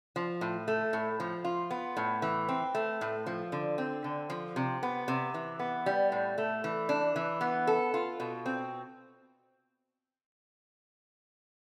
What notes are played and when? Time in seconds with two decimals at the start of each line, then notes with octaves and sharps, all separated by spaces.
0.16 F3
0.41 A2
0.68 A3
0.93 A2
1.20 F3
1.44 F4
1.71 B3
1.97 A2
2.22 E3
2.49 C4
2.75 A3
3.01 A2
3.26 F3
3.52 D3
3.78 C4
4.04 D3
4.30 F3
4.56 C3
4.83 B3
5.08 C3
5.34 E3
5.59 B3
5.86 G3
6.12 A2
6.38 A3
6.64 E3
6.89 D4
7.16 E3
7.41 B3
7.67 A4
7.94 F4
8.20 B2
8.46 C4